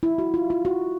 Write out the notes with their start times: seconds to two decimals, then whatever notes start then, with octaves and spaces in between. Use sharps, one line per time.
0.03 E4
0.18 F#4
0.34 F4
0.50 F4
0.65 F#4